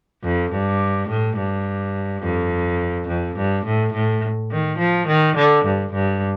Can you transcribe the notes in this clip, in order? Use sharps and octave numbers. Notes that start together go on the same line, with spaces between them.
F2
G2
A2
G2
F2
F2
G2
A2
A2
D#3
F3
D#3
D3
G2
G2